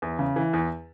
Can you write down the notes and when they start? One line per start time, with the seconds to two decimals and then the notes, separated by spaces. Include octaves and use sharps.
0.02 E2
0.19 C#3
0.36 E3
0.53 E2